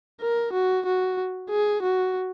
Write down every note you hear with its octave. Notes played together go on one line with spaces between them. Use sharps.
A#4
F#4
F#4
G#4
F#4